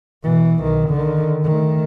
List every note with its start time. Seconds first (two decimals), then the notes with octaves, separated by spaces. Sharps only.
0.23 B2 E3
0.61 B1 D#3
0.90 D3 D#3
1.43 D#3 A3